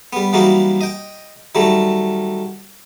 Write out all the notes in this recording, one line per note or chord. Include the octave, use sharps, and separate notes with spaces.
G3 B3
E3 F#3 G3 A#3 D#4 F#4
D#5 G5
D#3 F#3 G3 A3